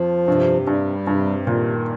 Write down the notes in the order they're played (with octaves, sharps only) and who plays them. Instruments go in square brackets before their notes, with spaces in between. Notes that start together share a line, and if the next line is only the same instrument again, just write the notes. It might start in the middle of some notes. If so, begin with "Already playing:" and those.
Already playing: [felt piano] F2 [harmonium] F3
[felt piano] G2 [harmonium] C3
[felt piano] G2 [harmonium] G3
[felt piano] G2 [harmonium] C3
[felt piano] A#2 [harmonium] D#3